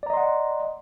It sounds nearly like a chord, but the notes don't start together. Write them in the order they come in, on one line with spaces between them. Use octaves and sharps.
D5 A#5 D#5 C6 F#5